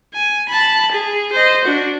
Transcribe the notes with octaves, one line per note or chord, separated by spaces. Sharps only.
G#5
A5 B5
G#4
C5 D#5
D4 F#4